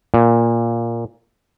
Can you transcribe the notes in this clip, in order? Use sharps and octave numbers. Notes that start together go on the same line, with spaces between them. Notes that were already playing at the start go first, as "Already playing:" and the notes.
A#2